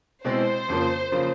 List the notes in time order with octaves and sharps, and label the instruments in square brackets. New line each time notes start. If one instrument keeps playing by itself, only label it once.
[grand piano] B2 G#3 C4 E4 [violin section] C5
[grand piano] F2 C#3 F3 A#3
C#3 F3 A#3